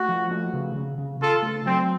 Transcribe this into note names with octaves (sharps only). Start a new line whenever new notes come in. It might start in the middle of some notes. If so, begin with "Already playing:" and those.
Already playing: A3 F#4
F3
A3
C#3
C#3
C#3
C#3 F4 A4
A3
F#3 C4